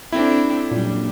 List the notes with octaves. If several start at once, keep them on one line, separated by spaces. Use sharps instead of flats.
C4 D4 E4 A4
F#2 A#2 G3 D4